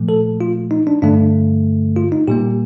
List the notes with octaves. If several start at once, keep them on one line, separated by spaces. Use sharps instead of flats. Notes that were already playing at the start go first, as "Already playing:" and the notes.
Already playing: A#2 F3 A3
A4
F4
D#4
D4
G2 D3 A3 D4
F4
D#4
A#2 G3 A#3 G4